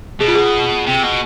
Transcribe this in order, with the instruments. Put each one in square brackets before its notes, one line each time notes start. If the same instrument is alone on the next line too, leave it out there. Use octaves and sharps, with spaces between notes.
[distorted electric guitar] B2 [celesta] G#4
[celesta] F4
G#4
[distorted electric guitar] C3
B2